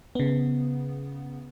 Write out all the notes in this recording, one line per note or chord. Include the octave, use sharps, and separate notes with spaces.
C#3 B3